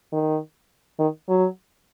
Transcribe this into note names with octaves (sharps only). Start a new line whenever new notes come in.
D#3
D#3
F#3